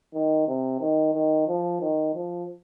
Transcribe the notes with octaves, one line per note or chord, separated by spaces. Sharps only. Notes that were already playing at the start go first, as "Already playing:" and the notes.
D#3
C3
D#3
D#3
F3
D#3
F3